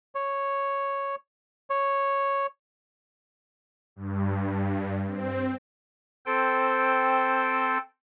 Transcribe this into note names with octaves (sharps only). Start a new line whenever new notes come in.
C#5
C#5
G2
C4
C4 A4 C5 G5